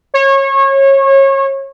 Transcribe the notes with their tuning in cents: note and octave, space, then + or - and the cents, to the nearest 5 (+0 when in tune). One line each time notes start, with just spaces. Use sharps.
C#5 -30